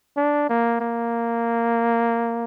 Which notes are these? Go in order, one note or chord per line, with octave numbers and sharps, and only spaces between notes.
D4
A#3
A#3